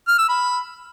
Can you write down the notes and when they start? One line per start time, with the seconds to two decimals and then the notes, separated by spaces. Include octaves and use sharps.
0.08 F6
0.18 E6
0.29 B5